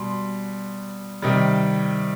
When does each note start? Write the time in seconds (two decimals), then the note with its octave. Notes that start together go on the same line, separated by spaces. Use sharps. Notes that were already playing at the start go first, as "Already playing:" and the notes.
Already playing: B2 G3 C6
1.22 C3 D#3 G3